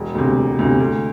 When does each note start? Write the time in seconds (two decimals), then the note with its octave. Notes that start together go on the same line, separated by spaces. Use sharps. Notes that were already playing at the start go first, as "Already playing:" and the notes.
Already playing: E1
0.15 D2 C3
0.36 E1
0.59 D2 C3
0.80 D2